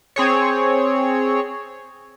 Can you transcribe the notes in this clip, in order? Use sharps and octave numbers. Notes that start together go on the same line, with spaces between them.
C4 G#4 C#5